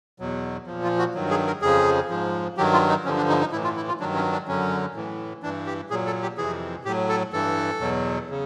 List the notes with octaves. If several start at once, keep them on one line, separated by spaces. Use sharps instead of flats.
E2 B2 F#3
A#2 F3
F4
F#4
G2 D#3 F#3
G#4
A#4
F2 C#3 F3 G#4
G#2 F3
G2 D#3 F#3 G4
F4
D#4
G2 D3 F3 C#4
D4
D#4
D#4
A2 E3 E4
F4
E4
F4
G2 D#3 F#3 D4
C#4
D4
F#2 D3 F#3 C#4
A2 E3
G2 E3 D4
G4
A#2 F#3 G#4
A4
G4
F2 C3 E3 G#4
A2 F#3 G4
A4
G2 E3 A4
E2 B2 F#3
C#3